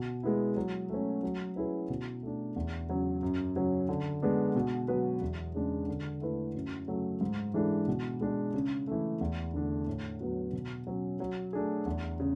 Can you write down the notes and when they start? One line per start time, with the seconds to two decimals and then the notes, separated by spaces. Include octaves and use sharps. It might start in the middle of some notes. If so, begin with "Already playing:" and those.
Already playing: B2
0.23 G#3 B3 E4
0.56 F#3
0.90 A3 C#4
1.23 F#3
1.56 C#4 E4 G#4 B4
1.90 B2
2.23 A3 D4
2.56 E2
2.90 C#3 F#3
3.23 F#2
3.56 C#3 F#3 C#4
3.89 D3
4.22 G#3 B3 D4
4.56 B2
4.88 F#3 B3 F#4 B4
5.22 E2
5.54 C#3 G#3 D4
5.88 D3
6.21 A3 E4 B4
6.55 F#2
6.88 C#3 F#3 A3
7.21 G#2
7.54 E3 G#3 D4 A4
7.88 B2
8.21 G#3 D4 G#4
8.54 C#3
8.87 E3 A3
9.21 E2
9.54 D3 A3 D4
9.87 A2
10.20 F#3 B3 F#4
10.53 B2
10.87 F#3 C#4
11.20 F#3
11.53 A3 D4 G#4
11.86 E2
12.20 C#3